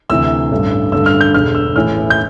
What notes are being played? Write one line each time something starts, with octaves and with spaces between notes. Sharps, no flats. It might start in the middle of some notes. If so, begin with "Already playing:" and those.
D2 C3 E3 E6
A1 G2 D3
A1 G2 D3 E6
F6
G6
E1 E2 D3 F6
E6
A1 A2 E3 F6
G6